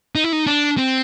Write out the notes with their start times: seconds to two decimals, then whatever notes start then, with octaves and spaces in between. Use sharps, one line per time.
0.15 D#4
0.24 E4
0.32 D#4
0.47 D4
0.78 C4